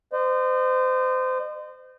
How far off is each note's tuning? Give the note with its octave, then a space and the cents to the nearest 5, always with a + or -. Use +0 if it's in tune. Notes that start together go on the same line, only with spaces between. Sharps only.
C5 -30 D#5 -40